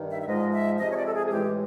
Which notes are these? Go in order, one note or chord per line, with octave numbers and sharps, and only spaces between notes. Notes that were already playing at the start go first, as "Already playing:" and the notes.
Already playing: G2 D#3
E5
E5
G#2 F3 G#3 D#5
E5
C3 F3 G#3 D#5
C#5
D5
A4
G#4
G#4
A2 E3 G#3 G4